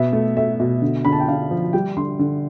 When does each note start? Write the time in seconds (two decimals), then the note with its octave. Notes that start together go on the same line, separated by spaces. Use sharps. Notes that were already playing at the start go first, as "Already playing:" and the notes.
Already playing: B2 B3 E5
0.13 A3
0.37 A3 E5
0.60 B2
0.82 D3
1.05 D3 B5
1.12 A5
1.20 G5
1.28 D3 F5
1.51 F3
1.73 G3 G5
1.97 D3 C6
2.19 D3